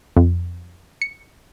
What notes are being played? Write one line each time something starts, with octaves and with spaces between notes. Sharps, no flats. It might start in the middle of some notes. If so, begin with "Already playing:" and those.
F2
C#7